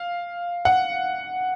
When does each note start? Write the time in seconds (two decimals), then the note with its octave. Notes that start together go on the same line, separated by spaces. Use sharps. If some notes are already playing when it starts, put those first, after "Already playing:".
Already playing: F5
0.65 F#5